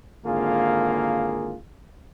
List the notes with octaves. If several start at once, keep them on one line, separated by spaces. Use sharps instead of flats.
G#1 D3 A#3 F4 G#4